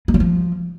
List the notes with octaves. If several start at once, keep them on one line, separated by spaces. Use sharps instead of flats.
G#3
G3
F3